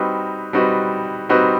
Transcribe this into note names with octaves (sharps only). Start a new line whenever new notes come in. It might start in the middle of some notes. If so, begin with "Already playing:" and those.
Already playing: G3 C4 D#4 F#4 B4
G3 C4 D#4 F#4 B4
G3 C4 D#4 F#4 B4